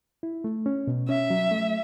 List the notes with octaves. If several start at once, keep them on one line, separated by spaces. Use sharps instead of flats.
E4
A3
C#4
B2
C#4 E5
F#3
A3